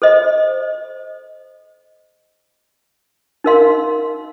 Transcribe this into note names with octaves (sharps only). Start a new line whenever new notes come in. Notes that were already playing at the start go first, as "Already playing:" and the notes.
A4 C5 D#5
D#4 A#4 F5 C6